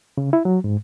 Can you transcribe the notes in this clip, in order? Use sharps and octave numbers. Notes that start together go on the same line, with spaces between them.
C#3
E4
F#3
G#2